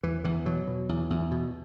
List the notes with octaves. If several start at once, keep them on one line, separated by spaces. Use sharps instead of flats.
E2 E3
E2 E3
B2 F#3
B2
E2
E2
B2